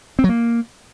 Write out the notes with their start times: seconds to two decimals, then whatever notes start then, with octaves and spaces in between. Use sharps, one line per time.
0.19 C4
0.24 F#3
0.29 A#3